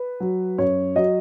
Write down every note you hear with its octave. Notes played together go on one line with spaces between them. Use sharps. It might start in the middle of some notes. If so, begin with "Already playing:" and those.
Already playing: B4
F#3
F#2 C#5
F#3 D#5